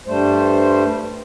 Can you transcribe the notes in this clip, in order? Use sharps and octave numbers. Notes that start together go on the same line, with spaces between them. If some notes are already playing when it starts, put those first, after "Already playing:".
G2 G3 A3 C5